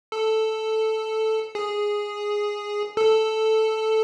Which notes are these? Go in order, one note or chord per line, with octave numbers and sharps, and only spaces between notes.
A4
G#4
A4